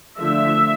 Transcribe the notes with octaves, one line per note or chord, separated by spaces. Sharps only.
D3 F3 A3 E5